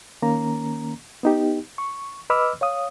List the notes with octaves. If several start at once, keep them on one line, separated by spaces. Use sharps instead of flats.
D#3 A#3 C#4 A#5
B3 D#4 G4
C#6
B4 D#5 B5 D6 E6 F6
C#5 F5 D#6